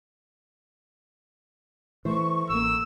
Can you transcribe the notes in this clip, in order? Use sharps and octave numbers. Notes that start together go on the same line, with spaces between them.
E3 A3 C5 E5 C#6
A1 A#3 A4 E6